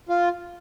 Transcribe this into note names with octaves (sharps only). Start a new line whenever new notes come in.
F4